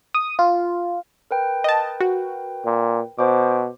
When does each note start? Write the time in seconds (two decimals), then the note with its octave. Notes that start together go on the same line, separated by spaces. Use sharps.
0.14 D#6
0.39 F4
1.31 A#4 B4 G5
1.64 D#5 A5
2.00 F#4
2.65 A#2
3.19 B2 C5 D6